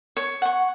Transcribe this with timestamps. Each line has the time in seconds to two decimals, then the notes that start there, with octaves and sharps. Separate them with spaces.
0.17 C#5
0.42 F#5 C#6